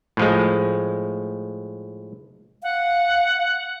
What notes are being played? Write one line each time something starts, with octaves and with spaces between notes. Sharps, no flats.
A2 F3 G#3
F5 F#5